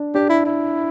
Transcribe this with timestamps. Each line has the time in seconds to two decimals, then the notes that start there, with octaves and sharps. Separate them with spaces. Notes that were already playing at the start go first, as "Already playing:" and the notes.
Already playing: D4
0.15 D4 G4
0.29 E4
0.45 E4